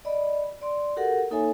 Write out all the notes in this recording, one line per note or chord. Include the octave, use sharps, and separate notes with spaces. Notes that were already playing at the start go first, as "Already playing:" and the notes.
D5 D#5 B5
D5 C6
F#4 G4 A4 A#4 F#5
A#3 D#4 A4 C#5 E5 G#5